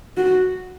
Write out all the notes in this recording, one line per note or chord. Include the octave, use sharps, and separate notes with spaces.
F#4